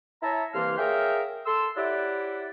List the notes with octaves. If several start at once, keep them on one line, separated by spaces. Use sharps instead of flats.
E4 C#5 E5 A5 A#5
C2 E3 A#3 F5 C6 F6
G#4 A#4 C#5 E5 F5 G5
A4 C6 E6
E4 G4 C#5 D5 E5 F#5